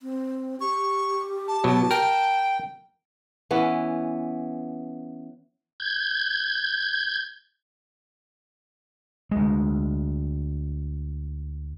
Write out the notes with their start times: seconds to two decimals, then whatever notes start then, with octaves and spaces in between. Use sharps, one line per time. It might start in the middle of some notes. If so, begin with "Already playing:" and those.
0.01 C4
0.61 G4 C#6
1.48 A5
1.64 B2 F#3
1.91 A#4 G5
3.51 E3 B3 C#4
5.80 G6 G#6
9.31 D2 G#3